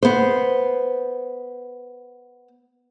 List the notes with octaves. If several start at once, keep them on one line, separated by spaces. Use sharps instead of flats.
B3 C5